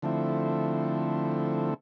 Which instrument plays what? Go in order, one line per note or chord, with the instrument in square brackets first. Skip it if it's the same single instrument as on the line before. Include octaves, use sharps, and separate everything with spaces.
[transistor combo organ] D3 F3 A3 C4 E4